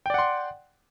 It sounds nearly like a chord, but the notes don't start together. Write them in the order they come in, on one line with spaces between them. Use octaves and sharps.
G5 D5 F#5 C6